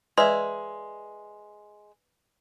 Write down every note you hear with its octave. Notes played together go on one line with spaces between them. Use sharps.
G#3 B4 D5 E5 C6